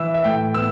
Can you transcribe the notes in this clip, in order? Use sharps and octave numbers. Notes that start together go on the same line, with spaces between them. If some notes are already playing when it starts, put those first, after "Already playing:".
Already playing: E3 E6
E5
A2 G5
B3 E6